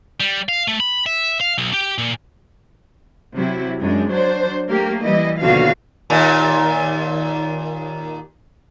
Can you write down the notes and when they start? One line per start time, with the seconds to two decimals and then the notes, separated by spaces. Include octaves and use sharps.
0.20 G3
0.49 F5
0.68 A3
0.80 B5
1.06 E5
1.41 F5
1.58 B1
1.73 G4
1.98 A#2
3.35 C3 F#3 E4
3.80 F#2 G#3 D4
4.09 F#3 D4 C5
4.68 A3 A#3 G4 A#4
5.01 E3 G3 E4 D#5
5.39 D#2 B2 D3 F3 F#4 F5
6.10 D#2 A#2